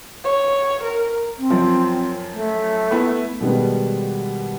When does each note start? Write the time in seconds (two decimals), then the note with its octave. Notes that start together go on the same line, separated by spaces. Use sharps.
0.24 C#5
0.83 A#4
1.38 C4
1.50 F#2 F3
2.34 A3
2.91 B3 E4
3.41 B2 D#3 G3 G#3 B3